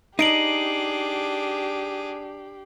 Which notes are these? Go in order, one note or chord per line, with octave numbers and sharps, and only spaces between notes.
D4 D#4 G4 G#4 C7 D7 F#7